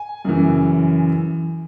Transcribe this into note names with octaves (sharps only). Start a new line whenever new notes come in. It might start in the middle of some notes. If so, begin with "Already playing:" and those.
Already playing: G#5
F#2 C#3 E3